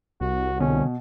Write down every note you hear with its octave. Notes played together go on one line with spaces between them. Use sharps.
C2 F#4
B2 D3 C#4